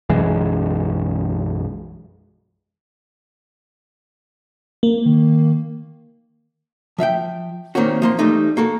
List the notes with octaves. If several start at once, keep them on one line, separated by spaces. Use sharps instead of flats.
B1 F#2 E3 G#3
A#3
D#3
F3 E5 F5 G5
A#2 D#3 A#3 C4 C#4 F#4
F3 A#3 C6
E3 G3 A3 D#4
A#3 F#4 A4